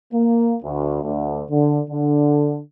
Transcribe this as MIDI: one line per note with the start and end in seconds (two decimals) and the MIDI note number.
0.13 0.56 58
0.63 0.99 38
1.02 1.43 38
1.49 1.80 50
1.89 2.59 50